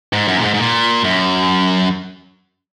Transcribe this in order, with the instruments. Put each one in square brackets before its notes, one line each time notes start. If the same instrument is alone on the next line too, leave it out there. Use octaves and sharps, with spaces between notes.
[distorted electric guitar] G#2
F#2
A#2
G#2
G#2
A#2
F#2